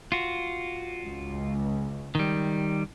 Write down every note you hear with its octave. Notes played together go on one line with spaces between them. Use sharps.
F4 F#4
C#2
D#3 G3